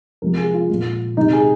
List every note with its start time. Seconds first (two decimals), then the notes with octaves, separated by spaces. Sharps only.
0.22 C3 F3 G#3 A#4
0.37 G#4
0.54 F4
0.69 A#2 G#3
1.17 C3 D#3 G#3 D#4
1.33 G#4